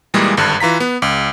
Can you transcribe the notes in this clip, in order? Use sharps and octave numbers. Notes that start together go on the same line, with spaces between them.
A#2 E3 G3 G#3 A#3 G#4
G#1 G2 D3 F#6
E3 F4 A#5 B6
B3
C#2